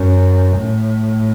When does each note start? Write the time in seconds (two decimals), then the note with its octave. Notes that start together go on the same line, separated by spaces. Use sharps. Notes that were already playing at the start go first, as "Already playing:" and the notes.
Already playing: F#2
0.57 A2